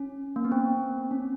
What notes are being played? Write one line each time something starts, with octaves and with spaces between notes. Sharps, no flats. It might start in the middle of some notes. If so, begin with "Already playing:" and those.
Already playing: C#4
A#3
B3
C4
C#4